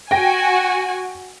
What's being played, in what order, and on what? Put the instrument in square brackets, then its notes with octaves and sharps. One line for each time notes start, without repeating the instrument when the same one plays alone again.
[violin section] F#4 G#5 [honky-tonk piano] G5 A#6